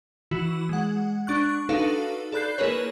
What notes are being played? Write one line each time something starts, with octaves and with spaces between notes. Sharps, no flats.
E3 E4 F#4
G#3 F#5
D4 C#6 F#6
D4 D#4 F#4 A4 B4 F5
A4 D5 B5 F#6 G6 C7
A#3 E4 G#4 A#4 B4 C#5